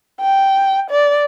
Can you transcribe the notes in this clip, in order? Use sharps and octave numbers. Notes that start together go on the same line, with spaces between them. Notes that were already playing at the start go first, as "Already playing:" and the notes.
G5
D5